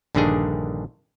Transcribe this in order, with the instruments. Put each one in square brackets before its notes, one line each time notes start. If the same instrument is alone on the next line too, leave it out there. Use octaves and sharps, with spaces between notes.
[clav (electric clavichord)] A#1 G2 D3 D#3 D4 G#4